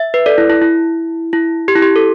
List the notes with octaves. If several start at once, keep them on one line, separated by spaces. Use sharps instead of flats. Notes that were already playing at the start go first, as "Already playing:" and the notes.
Already playing: E5
B4
A4 D5
E4
E4
E4
E4
G4
E4
G4
A4